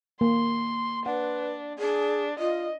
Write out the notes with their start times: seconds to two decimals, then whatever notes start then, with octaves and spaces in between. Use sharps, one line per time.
0.21 A#3 C6
1.06 D4 B4 F#5
1.79 D4 G#4
2.39 F4 D#5